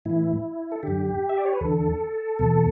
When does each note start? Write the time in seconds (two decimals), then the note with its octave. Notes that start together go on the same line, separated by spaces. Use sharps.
0.05 A2 E3 E4
0.72 A4
0.83 F#2 D3 G4
1.29 E5
1.38 D5
1.45 C#5
1.53 B4
1.61 E2 D3 A4
2.39 E2 B2